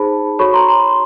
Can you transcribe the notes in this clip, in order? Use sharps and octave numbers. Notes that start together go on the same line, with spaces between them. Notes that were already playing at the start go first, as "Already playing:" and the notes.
Already playing: D#4 G#4 C5 A5 B5
F#4 A4 C#5 B5 C#6
A#5 C6
A#5 C6